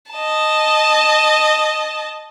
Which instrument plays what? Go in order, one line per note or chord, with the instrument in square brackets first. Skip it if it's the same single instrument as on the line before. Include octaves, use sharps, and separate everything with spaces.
[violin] D#5 A5